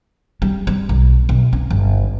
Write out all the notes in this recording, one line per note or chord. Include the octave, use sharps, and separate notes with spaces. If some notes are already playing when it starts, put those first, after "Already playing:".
G3
G3
B1
B1
C#4
G1